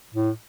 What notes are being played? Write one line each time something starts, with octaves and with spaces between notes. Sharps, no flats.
A2